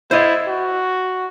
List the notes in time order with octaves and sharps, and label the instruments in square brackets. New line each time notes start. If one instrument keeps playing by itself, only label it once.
[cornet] E4 [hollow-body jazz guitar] C5 D#5
[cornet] F#4